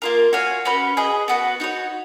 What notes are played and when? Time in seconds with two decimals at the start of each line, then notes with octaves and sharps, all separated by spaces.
0.02 A#3 F4 A#4
0.33 F#4 C#5 F5 G#5
0.65 C#4 F#4 B4
0.97 G#4 B4 D#5
1.28 B3 F#4 B4
1.60 D#4 F#4 C#5